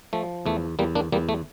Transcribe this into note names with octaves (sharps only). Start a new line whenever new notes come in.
F3 A3
E2 A3
E2 G3 A#3
A#3 D4
E2 G3 A#3
A3